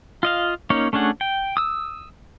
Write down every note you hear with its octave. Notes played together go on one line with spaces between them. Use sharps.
F4 D#5 F5
A#3 C#4 D#4 C#5
A3 C#4 D4 G#4 F#5
G5
D#6 E6